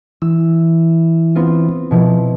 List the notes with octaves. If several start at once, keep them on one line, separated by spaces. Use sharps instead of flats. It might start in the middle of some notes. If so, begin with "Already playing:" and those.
E3 E6
B3 C4 F4
B2 F3 E4